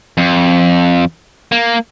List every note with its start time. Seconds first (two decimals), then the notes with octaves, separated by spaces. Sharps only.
0.17 F2
1.52 A#3